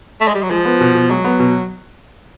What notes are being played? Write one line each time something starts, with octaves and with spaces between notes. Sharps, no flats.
A3
G#3
G3
F#3
F3 G#3
B3
B2
B2
F#3 G#3
B3
B2